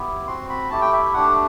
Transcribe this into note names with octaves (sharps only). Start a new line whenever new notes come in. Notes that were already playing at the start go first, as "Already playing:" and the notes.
Already playing: B3 E4 G4
C4 F#4 C6
B5
A3 E4 G4 A5
G5
E5
E5
A3 D4 G4 F#5